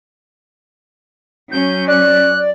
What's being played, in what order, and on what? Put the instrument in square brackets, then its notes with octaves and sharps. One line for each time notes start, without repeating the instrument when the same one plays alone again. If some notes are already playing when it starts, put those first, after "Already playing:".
[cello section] F#3 C#4 [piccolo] G6
[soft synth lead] D5 [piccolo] F#6